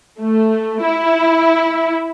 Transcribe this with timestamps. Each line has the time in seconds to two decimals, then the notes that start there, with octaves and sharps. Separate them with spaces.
0.20 A3
0.83 E4